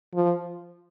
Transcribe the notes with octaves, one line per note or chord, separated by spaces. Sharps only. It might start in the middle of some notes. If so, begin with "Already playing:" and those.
F3